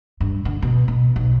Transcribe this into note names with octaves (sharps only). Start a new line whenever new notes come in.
G2
D3
B2
B2
B1